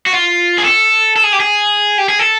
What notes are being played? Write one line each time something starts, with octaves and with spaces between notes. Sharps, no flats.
F#4
F4
G#4
A4
A4
G#4
G4
G#4
G4
G#4
A4